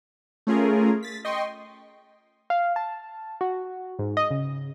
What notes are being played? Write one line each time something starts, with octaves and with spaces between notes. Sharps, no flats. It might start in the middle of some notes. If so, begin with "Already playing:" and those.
A3 C#4 F4 G#4 A#4
A6 B6
D#5 G5 C6 C#6
F5
A5
F#4
G#2
D#5
C#3